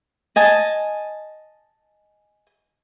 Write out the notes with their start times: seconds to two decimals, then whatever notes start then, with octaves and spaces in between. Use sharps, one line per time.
0.36 D#5 G#5 A5